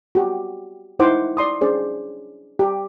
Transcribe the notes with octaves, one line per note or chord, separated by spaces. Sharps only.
F#4 G4
D#4 E4 C5 F#5 D6
D5 C6 D#6
C#4 D4 G#4 C5 D5
G4